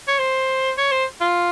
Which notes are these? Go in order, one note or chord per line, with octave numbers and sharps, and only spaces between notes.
C#5
C5
C#5
C5
F4